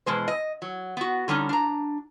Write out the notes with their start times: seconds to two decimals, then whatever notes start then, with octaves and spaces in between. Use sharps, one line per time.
0.06 E2 B2 G#3 C5
0.28 D#5
0.62 F#3
0.97 B3 F#4
1.28 D3 G3 C#4 D#4
1.49 D4 A#5